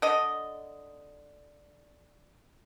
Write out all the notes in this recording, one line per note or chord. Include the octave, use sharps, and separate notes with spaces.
D3 D#5